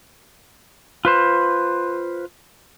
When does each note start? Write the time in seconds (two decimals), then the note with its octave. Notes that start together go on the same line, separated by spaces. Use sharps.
1.05 F4 B4 C5